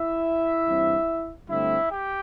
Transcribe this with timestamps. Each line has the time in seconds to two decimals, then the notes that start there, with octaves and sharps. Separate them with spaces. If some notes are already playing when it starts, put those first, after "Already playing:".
Already playing: E4 E5
0.67 G2 E3 C4
1.49 G2 D3 A3 C4 E4 E5
1.90 G4 G5